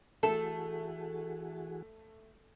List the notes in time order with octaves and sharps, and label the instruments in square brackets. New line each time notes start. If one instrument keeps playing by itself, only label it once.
[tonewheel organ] E3 F#4 G#4 [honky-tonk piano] A3 [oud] A4